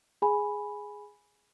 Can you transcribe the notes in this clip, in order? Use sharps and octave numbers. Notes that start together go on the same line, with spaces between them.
G#4 G#5 B5